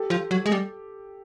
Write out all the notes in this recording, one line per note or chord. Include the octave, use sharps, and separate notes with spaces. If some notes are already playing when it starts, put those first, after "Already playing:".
Already playing: G4 A4
F3
F#3
G#3
G3